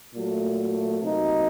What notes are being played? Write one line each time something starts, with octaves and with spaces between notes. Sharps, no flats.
A#2 F#3 A3
C3 F#3 A#3 D#4